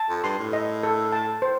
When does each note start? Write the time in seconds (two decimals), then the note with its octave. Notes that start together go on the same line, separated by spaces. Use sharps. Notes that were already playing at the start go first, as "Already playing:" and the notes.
Already playing: A5
0.09 F2
0.24 G2 C6
0.39 A2
0.53 D#5
0.83 A4
1.12 A5
1.42 C5